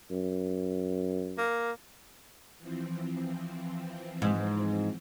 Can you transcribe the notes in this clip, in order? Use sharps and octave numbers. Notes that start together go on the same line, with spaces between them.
F#2
A#3
E3 F3 C4
G#2